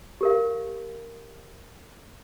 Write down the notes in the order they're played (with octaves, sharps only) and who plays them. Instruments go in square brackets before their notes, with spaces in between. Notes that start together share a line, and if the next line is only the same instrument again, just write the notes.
[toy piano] G4 A#4 F5